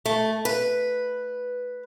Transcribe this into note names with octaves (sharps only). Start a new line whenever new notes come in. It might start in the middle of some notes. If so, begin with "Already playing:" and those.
A3
B4